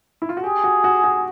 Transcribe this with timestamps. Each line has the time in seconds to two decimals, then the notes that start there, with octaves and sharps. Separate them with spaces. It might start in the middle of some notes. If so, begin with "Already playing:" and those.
0.22 E4
0.29 F4
0.37 F#4
0.43 G4 G#4
0.64 F#4
0.84 F#4
1.04 F#4